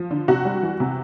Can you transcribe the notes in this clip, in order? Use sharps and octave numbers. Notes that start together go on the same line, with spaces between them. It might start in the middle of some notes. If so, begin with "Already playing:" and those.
Already playing: F3
D3
C3 F#4
G3
E3
C3